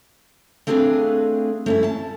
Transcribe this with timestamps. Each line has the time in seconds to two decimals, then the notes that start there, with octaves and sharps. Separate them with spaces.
0.67 A3 C4 D4 G#4 B4 F5
1.66 A3 C#4 E4
1.84 A5